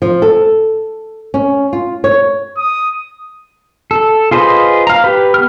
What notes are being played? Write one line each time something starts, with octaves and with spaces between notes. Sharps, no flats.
F3
A4
C#4
F4
C#5
D#6
A4
F4 G#4 B4 C5 D#5
F5 A#5
G4 B4
B3 F6